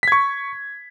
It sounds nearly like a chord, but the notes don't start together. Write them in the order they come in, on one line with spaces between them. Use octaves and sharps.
B6 G#6 C#6